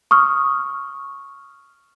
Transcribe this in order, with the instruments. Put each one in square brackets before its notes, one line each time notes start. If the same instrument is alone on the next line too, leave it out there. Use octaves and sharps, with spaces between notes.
[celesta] C#6 D#6 F6